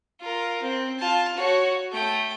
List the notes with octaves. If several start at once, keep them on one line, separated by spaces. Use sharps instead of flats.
F4 A#4
C4
F4 A5
F#4 C#5
A3 G5